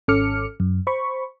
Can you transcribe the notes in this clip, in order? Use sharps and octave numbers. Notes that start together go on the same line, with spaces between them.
G#1 C#4 A4 D6 F6 C#7
F#2
C5 B5 C#6